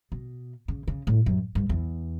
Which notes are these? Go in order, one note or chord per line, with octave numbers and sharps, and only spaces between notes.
B2
C#3
C#3
A2
F#2
G2
E2